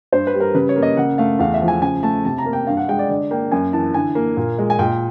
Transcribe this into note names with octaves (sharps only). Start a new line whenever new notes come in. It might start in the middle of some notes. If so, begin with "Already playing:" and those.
G2 C5
B4
G3
A#4
C#3 B4
C#5
A#3
D#5
C#3 F#5
A3 F5
E2 F5
E5
F3
G#5
C#3 G#5
A3 A5
C3 A5
A#5
A#3
G5
G2 F5
F#5
G#3 G5
D5
D3 D5
A#3 G5
F#2 G#5
E3 A5
D3 G#5
A#3
A#2
G#3
G#5
A#2 G5